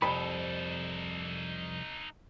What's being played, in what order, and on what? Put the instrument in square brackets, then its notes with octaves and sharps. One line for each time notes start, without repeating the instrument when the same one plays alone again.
[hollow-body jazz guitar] C2 F2 B5 [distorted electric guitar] D#4 A4